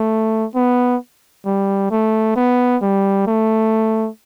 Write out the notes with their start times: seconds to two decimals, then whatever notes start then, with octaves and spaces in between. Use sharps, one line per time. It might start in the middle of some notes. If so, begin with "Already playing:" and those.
Already playing: A3
0.55 B3
1.46 G3
1.91 A3
2.36 B3
2.82 G3
3.27 A3